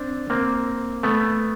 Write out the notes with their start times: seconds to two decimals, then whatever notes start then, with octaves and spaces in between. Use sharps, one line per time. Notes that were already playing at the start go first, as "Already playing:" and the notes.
Already playing: C4 D4
0.30 A#3 C4
1.03 A3 B3